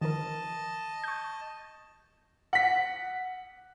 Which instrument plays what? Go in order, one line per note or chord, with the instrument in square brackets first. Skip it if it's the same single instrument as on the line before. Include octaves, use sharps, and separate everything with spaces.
[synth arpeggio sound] D#3 F3 A#4 [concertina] D#5 A5
[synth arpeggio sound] C#6 G6
[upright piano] F#5 B6